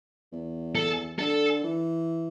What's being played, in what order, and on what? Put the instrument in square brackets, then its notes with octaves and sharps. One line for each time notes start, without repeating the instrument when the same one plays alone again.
[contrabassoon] E2
[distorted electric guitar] A4
[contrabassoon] D3 [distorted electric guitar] A4
[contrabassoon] E3